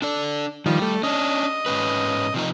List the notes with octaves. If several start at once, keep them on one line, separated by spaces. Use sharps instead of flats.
D4 A4 D5
D#3 F3 G3
A3
C#4 D4 D#5
G#2 C#4 B4
C3 F3 D#4